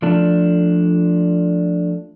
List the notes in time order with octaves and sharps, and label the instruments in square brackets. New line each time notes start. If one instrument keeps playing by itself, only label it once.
[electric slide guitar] F3 A3 D4